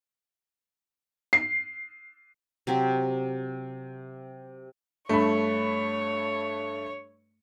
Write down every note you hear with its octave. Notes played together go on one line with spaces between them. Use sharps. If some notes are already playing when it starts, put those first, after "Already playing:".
C7
C3 F#3 C4 G4
G2 A3 C#5 B5